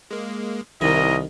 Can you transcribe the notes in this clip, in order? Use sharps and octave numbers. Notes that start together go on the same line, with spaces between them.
G#3 A#3
C2 D#3 E4 A#4 D#5